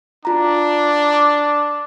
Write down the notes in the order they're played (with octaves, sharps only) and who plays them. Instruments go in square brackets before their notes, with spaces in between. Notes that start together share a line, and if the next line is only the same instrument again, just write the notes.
[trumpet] D4 [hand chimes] F4 A#5
[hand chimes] D6